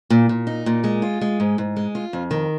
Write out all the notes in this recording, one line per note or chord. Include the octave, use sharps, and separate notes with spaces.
A#2
A#2
D#4
A#2
G#3
F4
G#3
G#2
G#2
G#3
F4
F2
D#3